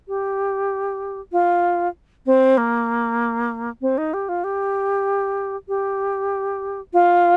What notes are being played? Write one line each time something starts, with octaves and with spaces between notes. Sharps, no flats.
G4
F4
C4
A#3
C4
D#4
G4
F4
G4
G4
F4